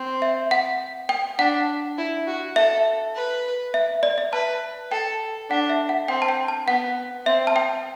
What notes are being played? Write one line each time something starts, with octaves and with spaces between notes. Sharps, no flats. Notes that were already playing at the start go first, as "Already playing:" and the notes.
Already playing: C4
E5
F#5
G5
D4 F#5
E4
F#4
A4 E5
B4
E5
D5
E5
B4 A5
A4 G5
D4 F#5
E5
F#5
C4 G5
A5
G5
A5
B3 F#5
C4 E5
A5
G5